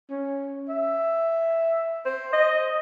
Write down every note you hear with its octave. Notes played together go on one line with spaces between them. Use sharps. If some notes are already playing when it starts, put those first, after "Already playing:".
C#4
E5
C5
D#5